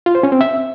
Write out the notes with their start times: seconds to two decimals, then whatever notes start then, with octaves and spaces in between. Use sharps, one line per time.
0.06 F4
0.15 C5
0.23 C#4
0.32 C4
0.41 E5